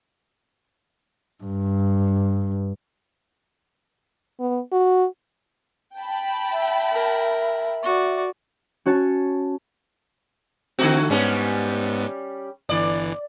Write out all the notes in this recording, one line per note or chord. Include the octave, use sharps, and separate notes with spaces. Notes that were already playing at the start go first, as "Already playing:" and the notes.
G2
B3
F#4
G5 A5 B5
E5
A#4
F#4 D5
C#4 F#4 C#5 A5 A6
D3 A3 C4 F#4
G#2 G3 B3 C#4
G1 E3 D5